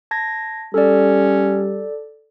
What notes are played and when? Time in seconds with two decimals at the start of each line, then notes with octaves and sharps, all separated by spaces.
0.11 A5 G#6 A#6
0.74 G3 C#4 A4 D5